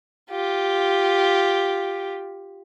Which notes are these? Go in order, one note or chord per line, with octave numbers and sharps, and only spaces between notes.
F4 G4